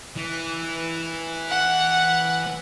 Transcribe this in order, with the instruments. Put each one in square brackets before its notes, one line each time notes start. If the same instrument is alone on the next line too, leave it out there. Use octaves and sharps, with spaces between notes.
[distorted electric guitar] E3
[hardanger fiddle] F#5